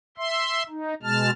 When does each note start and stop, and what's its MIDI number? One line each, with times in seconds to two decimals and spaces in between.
0.18 0.63 76
0.18 0.63 84
0.69 0.94 63
1.03 1.31 47
1.03 1.31 56
1.03 1.31 81
1.03 1.31 89